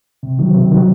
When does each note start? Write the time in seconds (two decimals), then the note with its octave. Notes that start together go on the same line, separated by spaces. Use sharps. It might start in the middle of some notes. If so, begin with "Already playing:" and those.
0.23 C3
0.39 D#3 F#3
0.54 C3
0.71 D#3 F#3